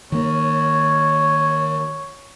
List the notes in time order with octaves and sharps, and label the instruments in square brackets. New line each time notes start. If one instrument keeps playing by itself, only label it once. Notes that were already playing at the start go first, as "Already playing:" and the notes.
[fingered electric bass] D#3 A#3 [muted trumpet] C#5